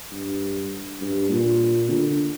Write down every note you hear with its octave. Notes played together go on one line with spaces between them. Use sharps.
G2
G2
A#2
D3